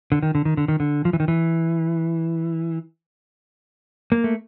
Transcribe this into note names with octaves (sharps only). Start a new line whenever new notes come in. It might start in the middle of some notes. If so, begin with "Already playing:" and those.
D3
D#3
D3
D#3
D3
D#3
D3
F3
E3
D#3
E3
A#3
A3